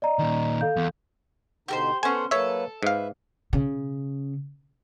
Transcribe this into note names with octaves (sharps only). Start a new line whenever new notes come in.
D5 D#5 A#5
A#2 D#3
A4 F5 G6
E2
B2 D3 D#4 G4 A#4 C5
B3 C#4 A4 C5 F#5 G#5
F#3 A#3 A4 B4 C#5 E5
G#2 B4 E5 F5
C#3